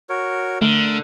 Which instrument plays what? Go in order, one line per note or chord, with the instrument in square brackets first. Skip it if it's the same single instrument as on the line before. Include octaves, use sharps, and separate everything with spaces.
[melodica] F#4 A#4 C#5
[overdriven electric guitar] D3 [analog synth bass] A3 [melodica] A#4